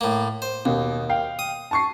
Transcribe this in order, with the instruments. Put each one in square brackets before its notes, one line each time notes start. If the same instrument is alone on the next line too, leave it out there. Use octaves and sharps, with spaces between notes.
[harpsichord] A2 A#3
C5
[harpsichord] D#2 [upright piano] B2
[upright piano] F5 G5
[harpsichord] D#6
[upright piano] A5 C#6 C7